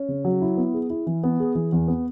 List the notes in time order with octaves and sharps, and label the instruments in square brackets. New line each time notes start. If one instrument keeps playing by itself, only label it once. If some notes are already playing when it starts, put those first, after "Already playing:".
Already playing: [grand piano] C#4
C#3
F#3
E4
B3
G#4
E4
E3
B3
G#4
E3
E2
B3